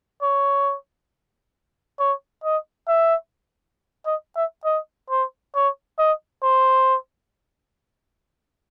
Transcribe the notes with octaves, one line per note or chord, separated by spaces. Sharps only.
C#5
C#5
D#5
E5
D#5
E5
D#5
C5
C#5
D#5
C5